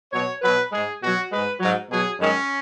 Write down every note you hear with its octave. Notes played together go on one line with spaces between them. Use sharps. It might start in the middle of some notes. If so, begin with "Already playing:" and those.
B2 F#3 C#5
B2 F#3 B4
G#2 G#3 G#4
B2 F#3 F#4
G#2 G#3 B4
G#2 F#3
B2 F#3 G#4
F#2 D#3 G#3 C#4